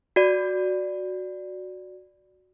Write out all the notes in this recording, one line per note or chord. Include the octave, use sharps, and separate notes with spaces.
F#4 D5